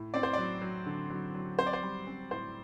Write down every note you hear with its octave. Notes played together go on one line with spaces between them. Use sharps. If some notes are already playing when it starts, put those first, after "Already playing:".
Already playing: A2
C4 D5
C5
F#3 D5
F#3
D3
F#3
F#3
C4 C5
D5
C5
G3
C4
A2 C5